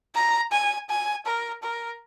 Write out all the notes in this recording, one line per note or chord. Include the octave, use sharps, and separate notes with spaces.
A#5
G#5
G#5
A#4
A#4